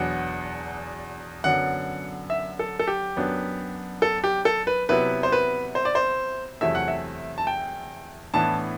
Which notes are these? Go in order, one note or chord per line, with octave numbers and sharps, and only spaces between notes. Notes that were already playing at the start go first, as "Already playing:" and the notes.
Already playing: E2 B2 F#3 B3 D4 F#5
F#2 D3 F#3 B3 F#5
E5
A4
A4
G4
F#2 F#3 B3 D4
A4
G4
A4
B4
C3 F#3 B3 E4 B4
C5
B4
C5
D5
C5
E2 C3 F#3 A3 E4 E5
F#5
E5
A5
G5
A2 E3 B3 D4 A5